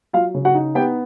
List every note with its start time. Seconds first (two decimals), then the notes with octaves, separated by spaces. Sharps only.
0.13 F#3 F4 F5
0.34 C#3
0.45 F#4 F#5
0.54 D#4
0.75 B3 G4 G5